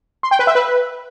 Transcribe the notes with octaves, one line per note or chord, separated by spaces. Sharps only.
C6
G5
B4
E5
B4